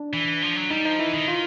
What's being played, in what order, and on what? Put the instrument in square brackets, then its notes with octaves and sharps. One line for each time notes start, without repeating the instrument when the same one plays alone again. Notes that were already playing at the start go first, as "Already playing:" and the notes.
Already playing: [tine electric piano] D4
[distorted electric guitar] E3
F3
F#3
[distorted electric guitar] G3 [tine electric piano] D#4
[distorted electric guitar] F3 [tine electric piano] D#4
[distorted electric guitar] E3 [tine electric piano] E4
[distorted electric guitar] D#3
[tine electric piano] F4